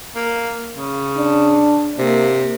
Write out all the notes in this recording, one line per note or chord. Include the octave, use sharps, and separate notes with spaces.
A#3
C#3
D4
C3 A#3